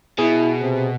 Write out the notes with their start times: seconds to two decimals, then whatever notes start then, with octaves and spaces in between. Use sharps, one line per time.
0.19 B2 E4 G#4
0.61 C3